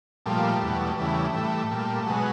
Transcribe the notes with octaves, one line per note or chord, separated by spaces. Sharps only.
A#2 F3 G3 A3
E2 B2 F#3
E2 C#3 E3 G3 A3
A2 E3 G3
A#2 G3
B2 F#3 G#3